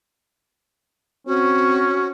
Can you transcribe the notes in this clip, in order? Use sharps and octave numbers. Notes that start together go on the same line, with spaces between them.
C4 C#4 F#4